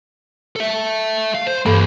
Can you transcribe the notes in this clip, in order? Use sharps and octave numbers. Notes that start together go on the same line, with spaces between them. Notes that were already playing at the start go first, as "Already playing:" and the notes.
A4 E5
F5
C5
G2 E3 A#3 A4 B5